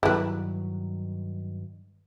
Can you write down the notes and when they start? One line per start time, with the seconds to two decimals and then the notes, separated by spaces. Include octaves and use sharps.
0.03 G2 D#3 F#3 E4 B4